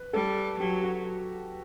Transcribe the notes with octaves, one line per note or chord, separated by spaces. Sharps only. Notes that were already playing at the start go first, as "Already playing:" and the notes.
Already playing: B4
G3 A4
F#3 G4
F#4